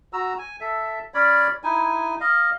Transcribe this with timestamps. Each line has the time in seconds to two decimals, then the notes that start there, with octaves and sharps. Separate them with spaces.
0.13 F#4 A#5 E6
0.38 G#5
0.61 A4 E5
1.14 C#4 C#5 D5 B5
1.64 D#4 E4 G#5
2.20 D#5 F5